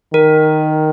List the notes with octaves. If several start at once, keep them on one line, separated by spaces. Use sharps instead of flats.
D#3 A#4